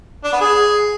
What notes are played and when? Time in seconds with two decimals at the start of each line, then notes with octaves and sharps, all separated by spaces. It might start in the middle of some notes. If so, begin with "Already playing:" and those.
0.24 D4
0.32 B3
0.41 G#4